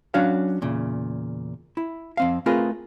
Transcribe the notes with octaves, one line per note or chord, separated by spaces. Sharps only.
F#3 C#4 D4 F#4 C#5 F5
E2 A#2 C#3
E4
F2 C4 F5
A3 C4 F4 G#4 A#4 B4